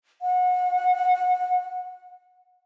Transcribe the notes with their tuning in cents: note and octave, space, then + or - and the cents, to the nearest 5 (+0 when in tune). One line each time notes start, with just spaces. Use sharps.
F#5 -30